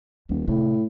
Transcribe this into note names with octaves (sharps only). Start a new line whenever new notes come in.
D#1 D#2
A2 C3